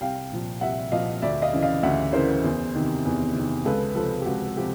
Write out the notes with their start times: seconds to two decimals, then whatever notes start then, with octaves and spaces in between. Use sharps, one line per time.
0.01 C2 F5 G5
0.32 A#2 F3
0.61 C2 E5 F#5
0.92 A#2 F3 D#5 F5
1.22 D2 D5 E5
1.42 D#5 F5
1.53 C#3 E3
1.62 D#5 F5
1.83 D2 E5 F#5
2.13 C#3 E3 A#4 C5
2.44 E2
2.75 C3 D#3
3.05 E2
3.35 C3 D#3
3.65 C#2 A4 B4
3.95 C3 F3 A4 B4
4.21 G4
4.26 C#2 F#4
4.57 C3 F3 G4